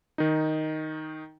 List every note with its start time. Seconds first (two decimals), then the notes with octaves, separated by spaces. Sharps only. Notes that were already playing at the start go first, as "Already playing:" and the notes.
0.18 D#3 D#4